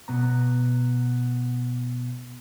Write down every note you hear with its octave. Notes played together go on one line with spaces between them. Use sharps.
B2 B3 A#5